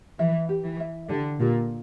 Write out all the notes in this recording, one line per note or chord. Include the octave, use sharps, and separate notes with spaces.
E3 E5
G4
E3
E5
D3 G4
A#2 G4